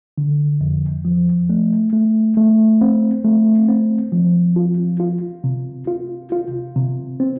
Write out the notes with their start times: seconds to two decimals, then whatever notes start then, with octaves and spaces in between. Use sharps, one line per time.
0.18 D3
0.61 F2
1.05 F3
1.50 A3
1.93 A3
2.37 A3
2.81 C4
3.24 A3
3.68 C4
4.12 F3
4.56 F4
5.00 F4
5.44 C3
5.87 F4
6.32 F4
6.76 C3
7.20 C4